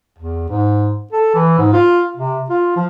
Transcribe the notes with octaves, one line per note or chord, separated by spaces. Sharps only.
E2
G#2
A4
E3
G#2
F4
C3
F4
F3